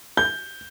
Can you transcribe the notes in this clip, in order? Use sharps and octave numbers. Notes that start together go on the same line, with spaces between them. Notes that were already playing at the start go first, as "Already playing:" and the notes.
G6